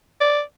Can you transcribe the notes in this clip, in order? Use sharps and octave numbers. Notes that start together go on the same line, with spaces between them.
D5